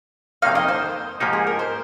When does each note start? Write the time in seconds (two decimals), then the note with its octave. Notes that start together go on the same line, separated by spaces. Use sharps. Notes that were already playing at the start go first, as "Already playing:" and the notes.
0.42 F2 C3 D#3 A#3 D#4 F5
0.55 D#5
0.68 C5
1.20 G#2 F3 A#3 D#4 G4
1.33 G#4
1.47 A#4
1.59 C5